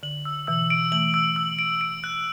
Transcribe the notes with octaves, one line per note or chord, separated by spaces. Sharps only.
D3 F#7
E6
B2 E3 E6
D7
E3 A3 F#7
E6
E6
D7
D7
F#6